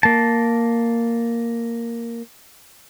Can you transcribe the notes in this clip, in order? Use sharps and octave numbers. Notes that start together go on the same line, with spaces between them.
A#3 A5